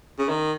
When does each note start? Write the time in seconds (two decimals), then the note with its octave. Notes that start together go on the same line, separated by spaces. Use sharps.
0.19 C#3
0.29 D#3